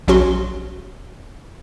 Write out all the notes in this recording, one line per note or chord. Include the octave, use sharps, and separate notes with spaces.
A#1 F#3 C#4 F#4 C6